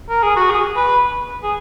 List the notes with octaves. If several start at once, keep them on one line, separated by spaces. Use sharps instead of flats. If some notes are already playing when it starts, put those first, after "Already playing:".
A#4
G#4
F#4
G#4
B4
G#4